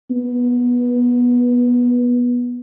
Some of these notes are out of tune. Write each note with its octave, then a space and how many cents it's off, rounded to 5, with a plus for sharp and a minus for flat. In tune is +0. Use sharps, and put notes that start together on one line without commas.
B3 -15